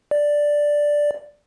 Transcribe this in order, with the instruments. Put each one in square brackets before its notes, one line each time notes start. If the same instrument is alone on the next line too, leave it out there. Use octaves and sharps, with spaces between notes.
[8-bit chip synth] D5